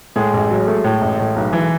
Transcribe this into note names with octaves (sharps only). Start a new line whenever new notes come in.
A2 G#3 G#4
A1
F#3
A3
A2
A1
A2
B1
E3